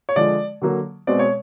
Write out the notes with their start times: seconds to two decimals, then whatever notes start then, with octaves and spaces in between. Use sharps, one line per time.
0.09 C#5
0.16 D3 F3 G#3 D5
0.62 D3 F#3 A#3
1.07 B2 G#3 C4 D5
1.19 C#5